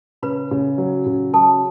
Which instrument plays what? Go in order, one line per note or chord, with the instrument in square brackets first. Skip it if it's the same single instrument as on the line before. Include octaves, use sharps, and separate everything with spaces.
[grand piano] C#3 [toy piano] B4 B5
[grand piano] C#3
F#3
C#3
[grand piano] F#3 [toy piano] A4 A5